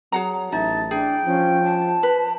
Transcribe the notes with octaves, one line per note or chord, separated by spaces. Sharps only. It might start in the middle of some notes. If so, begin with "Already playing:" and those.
F#3 G#4 F#5 A#5
A1 D#4 E5 A5
D4 G#4 G5
F3 C#4
A5
B4